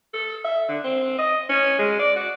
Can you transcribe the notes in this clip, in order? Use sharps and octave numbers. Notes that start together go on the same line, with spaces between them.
A4
E5
D3
C4
D#5
C#4
G#3
D5
F#4